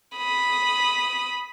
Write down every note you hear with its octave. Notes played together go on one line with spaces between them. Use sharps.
B5 D#6